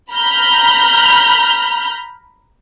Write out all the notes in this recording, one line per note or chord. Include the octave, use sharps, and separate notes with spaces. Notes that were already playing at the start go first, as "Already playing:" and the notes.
A#5 B5 F6 G6